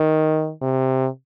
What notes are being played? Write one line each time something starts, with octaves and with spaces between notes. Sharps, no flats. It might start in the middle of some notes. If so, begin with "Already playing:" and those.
Already playing: D#3
C3